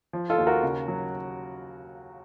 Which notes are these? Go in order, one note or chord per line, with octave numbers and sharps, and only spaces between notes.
F3
F4 A4
D#2
F#4 A#4
C#3
F#3